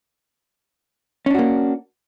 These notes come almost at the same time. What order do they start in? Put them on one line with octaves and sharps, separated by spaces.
C#4 D4 F#4 A#3